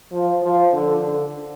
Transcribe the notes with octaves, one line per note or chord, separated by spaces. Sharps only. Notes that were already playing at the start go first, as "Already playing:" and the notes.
F3
F3
D3
D3